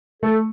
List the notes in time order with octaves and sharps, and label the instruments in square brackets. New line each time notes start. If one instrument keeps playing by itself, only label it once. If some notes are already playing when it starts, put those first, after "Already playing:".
[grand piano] A3 [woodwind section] A4